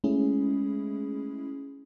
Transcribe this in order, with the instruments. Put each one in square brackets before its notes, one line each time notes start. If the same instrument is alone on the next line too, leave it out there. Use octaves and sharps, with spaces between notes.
[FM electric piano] G#3 A3 C#4 E4 G#4